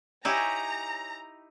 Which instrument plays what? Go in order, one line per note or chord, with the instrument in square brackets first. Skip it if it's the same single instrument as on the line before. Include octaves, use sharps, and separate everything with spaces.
[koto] D#4 E4 G4 [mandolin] C#5 G#5 [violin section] A#5